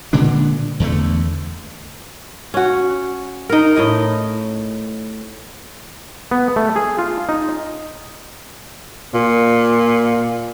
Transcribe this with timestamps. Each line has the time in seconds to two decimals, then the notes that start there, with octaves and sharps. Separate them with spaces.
0.13 A#2 D3 G#3 D4
0.80 E2 D3 A3
2.54 C#4 F#4
3.50 D#4 A#4
3.76 A2 D#4 D#5
6.31 B3
6.56 A3
6.76 G#4
6.99 F4
7.29 D#4
9.14 A#2